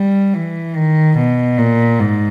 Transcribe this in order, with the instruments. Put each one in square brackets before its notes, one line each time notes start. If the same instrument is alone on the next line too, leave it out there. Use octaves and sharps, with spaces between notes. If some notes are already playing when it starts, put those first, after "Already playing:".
Already playing: [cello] G3
E3
D#3
B2
A#2
G#2